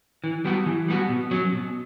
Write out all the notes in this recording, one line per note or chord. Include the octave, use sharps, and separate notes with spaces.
E3
G3 B3 F#4
E3
G3 B3 F#4
B2
F#3 C#4
B2